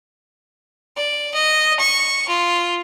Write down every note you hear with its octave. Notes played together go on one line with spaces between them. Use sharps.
D5
D#5
C#6
F4